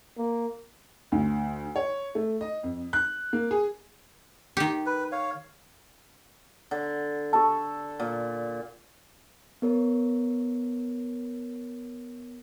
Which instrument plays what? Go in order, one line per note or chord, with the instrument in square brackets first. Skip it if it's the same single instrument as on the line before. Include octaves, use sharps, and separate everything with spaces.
[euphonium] A#3
[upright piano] D2
C#5
A3
D#5
F2
F#6
A#3
G#4
[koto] D#3 G4
[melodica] B4
C#5 F5
[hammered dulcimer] D3
[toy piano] G4 A5 [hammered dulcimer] A4
[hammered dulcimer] A#2
[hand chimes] B3 A#4 C#5